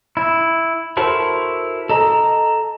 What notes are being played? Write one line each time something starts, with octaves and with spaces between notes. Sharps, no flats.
E4
E4 F#4 A4 A#4 C5
A4 D#5 A#5